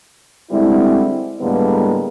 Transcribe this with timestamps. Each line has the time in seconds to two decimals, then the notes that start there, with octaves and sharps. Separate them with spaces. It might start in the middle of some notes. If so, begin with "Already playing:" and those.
0.51 D3 G3 G#3 C4 E4
1.41 A2 D3 G3 G#3 A#3 B3